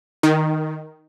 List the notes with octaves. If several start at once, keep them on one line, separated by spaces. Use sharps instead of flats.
D#3